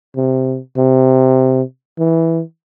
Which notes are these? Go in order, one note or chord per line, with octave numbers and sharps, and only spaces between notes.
C3
C3
E3